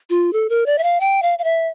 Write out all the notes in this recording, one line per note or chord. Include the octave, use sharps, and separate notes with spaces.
F4
A4
A#4
D5
E5
F5
G5
F5
F5
E5